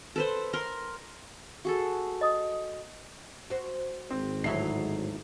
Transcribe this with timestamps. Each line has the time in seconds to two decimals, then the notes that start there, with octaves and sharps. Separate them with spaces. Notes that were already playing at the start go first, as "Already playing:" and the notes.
0.16 A4 B4 C5
0.53 A#4 C6
1.65 F#4 G#4 A4
2.21 D#5 D#6
3.50 F#4 C5
4.10 G#1 G#2 C4
4.44 D2 A2 F#3 D#4 E4 C7